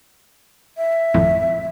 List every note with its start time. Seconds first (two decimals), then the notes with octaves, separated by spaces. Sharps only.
0.77 E5
1.14 G#1 F2 A2